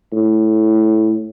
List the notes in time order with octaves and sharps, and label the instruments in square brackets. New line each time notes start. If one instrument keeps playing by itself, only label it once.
[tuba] A2